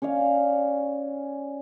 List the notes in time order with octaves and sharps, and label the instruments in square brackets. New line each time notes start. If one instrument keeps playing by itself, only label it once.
[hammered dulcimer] C#4 C#5 D5 F5